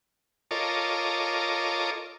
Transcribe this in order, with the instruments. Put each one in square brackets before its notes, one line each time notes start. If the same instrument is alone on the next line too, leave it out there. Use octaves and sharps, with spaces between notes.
[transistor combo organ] F4 A4 A#4 C#5 D#5 D6